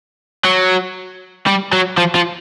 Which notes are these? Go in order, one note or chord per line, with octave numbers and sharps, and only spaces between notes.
F#3
G3
F#3
F3
F3